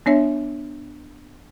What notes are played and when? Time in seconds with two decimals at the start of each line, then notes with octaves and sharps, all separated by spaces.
0.06 B3 D4 C#5 E5